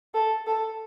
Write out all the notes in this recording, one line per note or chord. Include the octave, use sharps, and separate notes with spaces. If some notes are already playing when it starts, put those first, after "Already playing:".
A4
A4